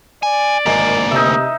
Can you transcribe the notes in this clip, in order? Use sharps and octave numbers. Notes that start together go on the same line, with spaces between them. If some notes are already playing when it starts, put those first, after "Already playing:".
D5 G#5
G#1 D2 A#3 D#5 G#5
C3 D#4 D#5 E5